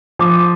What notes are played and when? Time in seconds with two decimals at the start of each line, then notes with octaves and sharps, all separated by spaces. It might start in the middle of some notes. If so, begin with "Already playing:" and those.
0.19 F3 D6